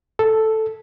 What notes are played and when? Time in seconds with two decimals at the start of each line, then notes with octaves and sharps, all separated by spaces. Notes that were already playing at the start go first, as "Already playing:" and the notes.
0.19 A4